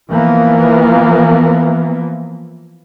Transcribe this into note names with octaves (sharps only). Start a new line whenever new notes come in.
E3 F3 A#3 B3